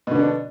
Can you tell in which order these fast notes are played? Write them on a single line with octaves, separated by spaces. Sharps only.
B2 D3 B3 D4